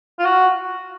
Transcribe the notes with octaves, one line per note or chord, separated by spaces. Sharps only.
F4
F#4